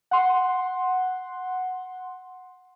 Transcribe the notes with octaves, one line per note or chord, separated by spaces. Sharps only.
F#5 C6